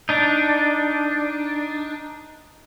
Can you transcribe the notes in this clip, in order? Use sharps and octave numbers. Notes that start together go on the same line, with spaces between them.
D4 D#4